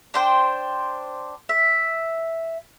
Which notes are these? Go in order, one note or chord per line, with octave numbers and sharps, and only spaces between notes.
D4 C5 G5
E5